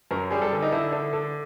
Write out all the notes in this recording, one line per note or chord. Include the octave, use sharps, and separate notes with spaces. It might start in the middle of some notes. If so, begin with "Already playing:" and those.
F#2 A#4
G3 G#4
A4
D3
D#4
D3 E4
D3
D3